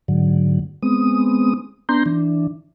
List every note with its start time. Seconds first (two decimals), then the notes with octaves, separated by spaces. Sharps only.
0.08 G#2 D3 F#3
0.83 G#3 B3 C4 D#6
1.89 B3 D4 A#5 C6 G6
2.06 E3 D4